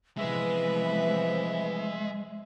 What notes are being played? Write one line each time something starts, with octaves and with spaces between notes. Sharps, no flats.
C3 E3 F3 G#3 B3 B4 E5